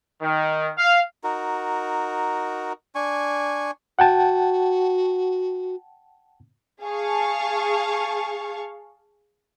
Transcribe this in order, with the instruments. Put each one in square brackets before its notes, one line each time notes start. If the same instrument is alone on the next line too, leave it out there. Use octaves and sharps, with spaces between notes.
[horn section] D#3
F5
[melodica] D#4 F#4 A#4
D4 G#5 C#6
[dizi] F#4 [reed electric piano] F#5 G5 A5
[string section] G#4 F5 A5 C#6